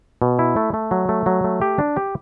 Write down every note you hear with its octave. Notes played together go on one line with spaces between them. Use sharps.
B2
E4
A3
A3
F#3
A3
F#3
A3
G4
D4
G4